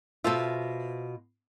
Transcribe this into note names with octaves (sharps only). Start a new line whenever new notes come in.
B2 F4 A4 C5 E5